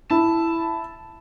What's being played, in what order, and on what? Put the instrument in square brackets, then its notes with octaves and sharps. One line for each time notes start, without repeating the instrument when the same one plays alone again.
[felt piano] E4 [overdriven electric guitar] A5